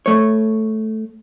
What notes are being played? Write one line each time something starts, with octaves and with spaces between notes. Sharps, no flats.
A3 C#5